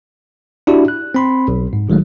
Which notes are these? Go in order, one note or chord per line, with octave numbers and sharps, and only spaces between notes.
D4 E4 F#4 G4 D5
F#6
C4 B5 C6
B1
G#2
A#1 D#3 F#3 G#3 A3